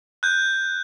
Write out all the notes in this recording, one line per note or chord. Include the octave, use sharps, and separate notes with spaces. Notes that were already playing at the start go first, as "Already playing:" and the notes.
F#6 G6